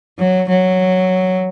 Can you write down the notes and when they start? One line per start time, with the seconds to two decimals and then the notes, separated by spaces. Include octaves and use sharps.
0.19 F#3
0.49 F#3